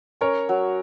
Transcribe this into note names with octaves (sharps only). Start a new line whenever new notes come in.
C#4 A#4 C#5
F#3